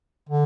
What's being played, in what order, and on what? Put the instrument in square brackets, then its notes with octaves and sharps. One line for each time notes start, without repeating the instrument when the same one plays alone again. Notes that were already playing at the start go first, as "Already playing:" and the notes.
[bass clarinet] D3